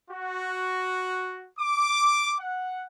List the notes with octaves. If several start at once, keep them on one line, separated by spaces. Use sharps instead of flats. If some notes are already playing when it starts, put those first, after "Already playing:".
F#4
D6
F#5